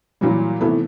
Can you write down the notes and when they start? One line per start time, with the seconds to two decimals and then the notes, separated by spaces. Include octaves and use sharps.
0.21 A#2 E3 F#3 G3
0.61 A2 C3 D#3 E3 A3 B3